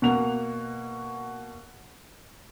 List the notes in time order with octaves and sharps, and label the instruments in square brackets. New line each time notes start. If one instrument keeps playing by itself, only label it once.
[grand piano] B2 A#3 F#5 F7